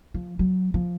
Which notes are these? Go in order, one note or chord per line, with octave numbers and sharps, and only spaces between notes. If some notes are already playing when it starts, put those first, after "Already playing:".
F3
F#3
F3